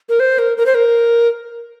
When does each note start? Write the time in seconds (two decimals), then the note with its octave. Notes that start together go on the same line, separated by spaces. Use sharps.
0.09 A#4
0.20 C5
0.39 A#4
0.57 A#4
0.66 C5
0.75 A#4